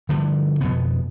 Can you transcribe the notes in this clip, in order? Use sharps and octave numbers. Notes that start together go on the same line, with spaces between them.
D3 E3 F3 G3
F2 B2 B3